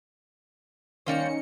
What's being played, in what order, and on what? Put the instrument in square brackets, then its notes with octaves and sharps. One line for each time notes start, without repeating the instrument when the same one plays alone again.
[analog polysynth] D#3 C#4 C#7 [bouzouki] G3 A#3 C5